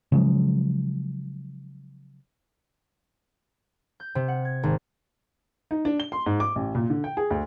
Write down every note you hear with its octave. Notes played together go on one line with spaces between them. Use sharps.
C#3 F3 F#3 G#3
G6
C3
F#5
G#6
G#1
D#4
D4
G7
C6
G#2
D6
A1
A#2
D3
G5
G#4
D2